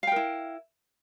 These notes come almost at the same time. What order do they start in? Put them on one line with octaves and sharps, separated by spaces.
F5 G5 A#4 E4